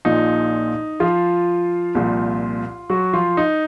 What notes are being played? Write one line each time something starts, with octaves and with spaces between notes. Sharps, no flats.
A#1 A#2 F3 D#4
F3 F4
C2 A#2 F3
F#3 F#4
F3 F4
D#4